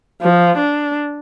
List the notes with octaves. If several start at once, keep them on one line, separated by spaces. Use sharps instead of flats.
F3
D4